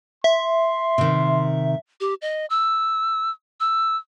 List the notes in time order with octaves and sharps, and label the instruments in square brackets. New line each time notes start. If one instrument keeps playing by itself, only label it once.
[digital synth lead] E5 [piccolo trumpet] C6
[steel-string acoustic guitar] C3 D#3
[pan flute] G4
D#5
E6
E6